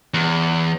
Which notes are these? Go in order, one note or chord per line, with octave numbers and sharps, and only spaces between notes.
E2